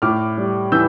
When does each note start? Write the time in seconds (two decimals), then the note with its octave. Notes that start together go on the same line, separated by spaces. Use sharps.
0.02 A2 D6 F6
0.38 G3
0.72 E3 E6 G6